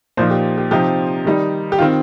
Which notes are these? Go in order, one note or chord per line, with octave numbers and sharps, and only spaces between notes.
A#2 F3 D#4 C5
G4
G4
C3 F3 C4 D#4 G4
D#3 G3 D#4
G4
D#3 C4 F4